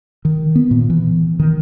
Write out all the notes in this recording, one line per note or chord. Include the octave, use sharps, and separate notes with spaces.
D#3
B3
A#2
E3
D#3